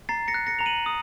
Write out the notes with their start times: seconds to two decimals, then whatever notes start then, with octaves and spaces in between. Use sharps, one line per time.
0.09 A#5 A6 C7
0.28 A#6 C#7
0.34 F#6
0.47 A#6 C#7
0.59 A#5 F7
0.66 D#7 F#7
0.86 D#6